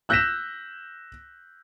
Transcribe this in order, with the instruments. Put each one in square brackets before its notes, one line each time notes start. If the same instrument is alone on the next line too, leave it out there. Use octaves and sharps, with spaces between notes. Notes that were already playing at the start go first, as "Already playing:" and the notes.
[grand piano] E6 F#6 G6 A#6 B6 E7